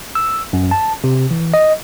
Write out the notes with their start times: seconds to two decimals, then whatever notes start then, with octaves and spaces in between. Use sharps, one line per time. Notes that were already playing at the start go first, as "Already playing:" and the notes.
0.15 E6
0.53 F#2
0.71 A5
1.04 C3
1.31 E3
1.54 D#5